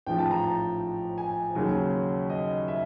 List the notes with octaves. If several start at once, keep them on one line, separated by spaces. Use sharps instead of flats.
A1 G#2 F3 G5
A5
A#5
A5
G#5
D#2 C#3 F#3
D#5
E5